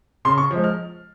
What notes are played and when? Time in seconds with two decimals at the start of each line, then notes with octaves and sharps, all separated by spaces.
0.25 C#3 C6
0.38 C#6
0.51 F3 G#3
0.64 F6